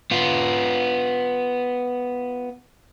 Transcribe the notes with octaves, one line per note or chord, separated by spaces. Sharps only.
B3 F4